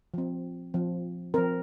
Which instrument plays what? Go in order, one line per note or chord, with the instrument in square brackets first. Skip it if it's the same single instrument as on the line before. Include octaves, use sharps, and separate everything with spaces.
[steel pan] F3 C4
F3 C4
F3 C4 A#4